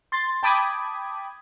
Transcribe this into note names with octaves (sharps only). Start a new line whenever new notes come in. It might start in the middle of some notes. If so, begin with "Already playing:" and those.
C6 A6
G5 A5 B5 D6 D#6 G#6